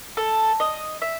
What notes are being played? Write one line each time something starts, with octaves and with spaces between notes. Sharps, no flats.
A4
D#5
E5